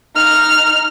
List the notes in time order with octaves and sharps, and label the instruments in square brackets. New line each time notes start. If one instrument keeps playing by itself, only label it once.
[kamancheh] D#4 F6